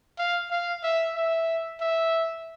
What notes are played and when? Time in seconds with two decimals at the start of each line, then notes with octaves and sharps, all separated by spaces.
0.18 F5
0.51 F5
0.83 E5
1.16 E5
1.81 E5